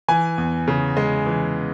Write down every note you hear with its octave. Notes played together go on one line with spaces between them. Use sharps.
E3 G#5
E2
C#3
G#3
E3